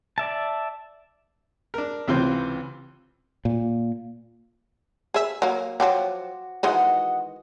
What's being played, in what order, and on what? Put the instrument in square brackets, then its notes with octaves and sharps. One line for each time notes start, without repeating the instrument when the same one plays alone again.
[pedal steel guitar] D5 E5 A5
[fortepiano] D4 A#4
C#2 C3 E3 C4 F4 C5
[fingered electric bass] A#2
[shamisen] G#4 E5
F#3 A#3
[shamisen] F3 F#3 G5 [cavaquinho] F#4 D6
[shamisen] D#3 E3 G#3 [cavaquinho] F#4 D#5 F#5